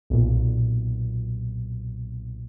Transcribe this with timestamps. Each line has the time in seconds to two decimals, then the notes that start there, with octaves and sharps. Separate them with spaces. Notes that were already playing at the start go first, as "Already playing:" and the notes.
0.10 B1 A#2